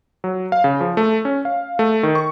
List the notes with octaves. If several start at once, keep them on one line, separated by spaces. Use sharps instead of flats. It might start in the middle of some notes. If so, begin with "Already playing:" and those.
F#3
F5
C#3
F3
A3
C#4
F5
A3
D#3
C#6